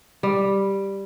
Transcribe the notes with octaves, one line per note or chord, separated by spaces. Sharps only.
G3